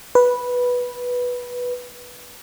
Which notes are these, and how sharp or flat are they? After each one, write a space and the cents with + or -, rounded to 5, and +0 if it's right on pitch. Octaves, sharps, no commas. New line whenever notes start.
B4 -10